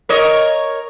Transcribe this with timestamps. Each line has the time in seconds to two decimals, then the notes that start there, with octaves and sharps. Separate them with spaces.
0.09 A#4 C#5 D#5